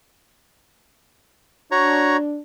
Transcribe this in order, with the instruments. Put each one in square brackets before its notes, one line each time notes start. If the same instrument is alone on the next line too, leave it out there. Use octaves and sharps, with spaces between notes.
[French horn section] D4 [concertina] F#4 C#5 A#5